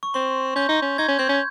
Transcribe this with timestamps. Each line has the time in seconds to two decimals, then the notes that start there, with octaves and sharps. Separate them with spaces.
0.03 C#6
0.14 C4 C6
0.56 C#4 G6
0.69 D#4
0.82 C#4
0.98 D#4 G#6
1.08 C#4
1.19 C4 G6
1.29 C#4